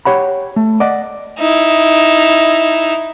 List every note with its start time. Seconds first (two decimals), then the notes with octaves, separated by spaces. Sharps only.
0.05 G4 C#5 F#5 B5
0.56 A3
0.80 D5 D#5 F#5
1.39 D#4 E4